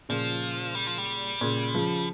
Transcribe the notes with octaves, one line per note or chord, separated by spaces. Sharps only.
A#2 C#3 F3
G3
F3
G3
A#2 C#3
C#3 F3